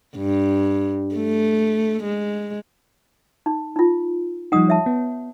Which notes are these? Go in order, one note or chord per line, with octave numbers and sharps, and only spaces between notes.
G2
A3
G#3
D#4
D#4 F4
F3 G3 D#4 F#5 D#6
C#5 E5 A5
B3